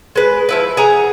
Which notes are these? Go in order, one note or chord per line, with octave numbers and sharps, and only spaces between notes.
G#3 B4
F3 E4 B4
G#4 F#5 A#5